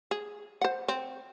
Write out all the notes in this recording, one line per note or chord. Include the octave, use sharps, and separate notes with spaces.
G#4
C5 F#5
C4